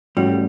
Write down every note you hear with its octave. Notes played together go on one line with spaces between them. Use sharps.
G#2 E3 G3 A3 C#4 F#4